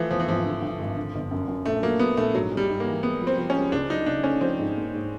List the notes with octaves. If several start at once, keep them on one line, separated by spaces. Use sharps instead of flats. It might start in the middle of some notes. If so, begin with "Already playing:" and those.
Already playing: E3 F3 A3
E2 F3
E3
G#1 F3
D3
G2
G#1
D3
G1
F#2
F#2
A#1 A3
F#3 A#3
F#3 B3
A#1 A3
G#2 F#3
G#3
G3
G#2
A#3
E3
G#3 B3
F3
C4
F3
G#3 C#4
C#2 D4
F#3 D#4
C#3 D4
A3 C#4
F3 C4
G#2
A#3
G#2